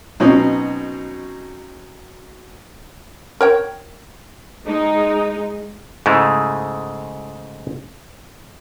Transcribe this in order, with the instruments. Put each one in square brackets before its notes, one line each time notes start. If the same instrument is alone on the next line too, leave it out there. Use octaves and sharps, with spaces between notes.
[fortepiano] B2 F#3 C4 C#4 D#4
[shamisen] A#4 C#5 G5
[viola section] G#3 D#4
[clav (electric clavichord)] G#2 C#3 G#3 A3 E4